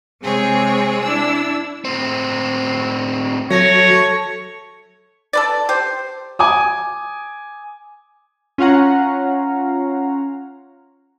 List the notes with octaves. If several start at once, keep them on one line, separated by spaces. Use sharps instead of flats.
C3 G#3 C4 G#4 C#5
D4 E4 D5 E6
A2 C4
F#3 A3 C#5 A#6
A4 B4 D5
G4 C5
G#5 D6 D#6
C#4 F4 F5 F#5 A#5